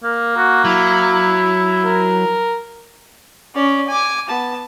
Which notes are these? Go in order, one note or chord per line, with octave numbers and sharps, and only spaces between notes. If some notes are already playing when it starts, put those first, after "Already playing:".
A#3 A#4
F#4
F#3 E4
A#4
C#4 D5
G#5 D6
B3 A5